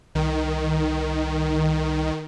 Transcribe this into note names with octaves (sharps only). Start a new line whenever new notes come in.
C2 D#3